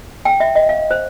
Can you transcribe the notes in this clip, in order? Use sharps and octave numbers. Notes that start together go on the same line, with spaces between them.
G5
E5
D#5
F5
C5